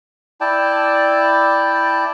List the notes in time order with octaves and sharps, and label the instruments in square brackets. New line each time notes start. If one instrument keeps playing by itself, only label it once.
[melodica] E4 D5 G5 A5